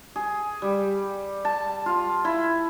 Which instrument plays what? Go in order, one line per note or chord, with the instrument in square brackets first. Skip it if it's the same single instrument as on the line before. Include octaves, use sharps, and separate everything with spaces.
[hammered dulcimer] G#4
G3
A5
F4
E4